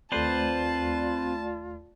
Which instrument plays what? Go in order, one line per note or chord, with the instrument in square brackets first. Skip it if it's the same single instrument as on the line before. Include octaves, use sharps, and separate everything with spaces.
[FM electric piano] D#2 A3 D5 [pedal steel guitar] C4 B4 C5 [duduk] F4 [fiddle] A5